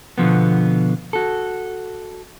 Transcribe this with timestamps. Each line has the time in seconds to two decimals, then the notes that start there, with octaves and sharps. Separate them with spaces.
0.18 B2 D3 F3 B3
1.13 F#4 A4